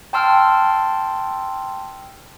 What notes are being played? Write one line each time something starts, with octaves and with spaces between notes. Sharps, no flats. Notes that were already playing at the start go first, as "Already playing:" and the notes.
G5 A5 C6 E6 F6